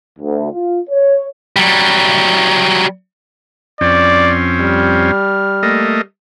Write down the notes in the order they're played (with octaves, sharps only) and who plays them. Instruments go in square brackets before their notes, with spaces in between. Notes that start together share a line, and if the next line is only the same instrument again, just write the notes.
[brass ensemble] D2
F4
C#5
[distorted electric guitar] F#3 G3
[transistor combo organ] F2 C4 C#4 [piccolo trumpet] D5
[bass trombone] G3 [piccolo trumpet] F6
[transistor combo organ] A3 A#3 D#5